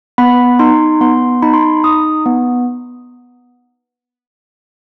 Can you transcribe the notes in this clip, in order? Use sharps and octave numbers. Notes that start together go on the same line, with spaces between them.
B3 B5
D#4 C6
B3 C6
D#4 B5
C6
B5
D#4 D#6
B3